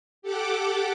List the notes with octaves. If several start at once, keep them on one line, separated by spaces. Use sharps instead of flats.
G4 A4 F#5 D6